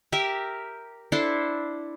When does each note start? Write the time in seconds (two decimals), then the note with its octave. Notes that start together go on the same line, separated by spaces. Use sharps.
0.12 G4 A#4 E5
1.12 D4 E4 A4 C5